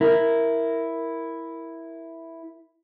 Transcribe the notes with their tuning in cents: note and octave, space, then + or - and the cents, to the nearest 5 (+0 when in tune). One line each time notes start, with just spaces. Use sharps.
E4 +0 A#4 +0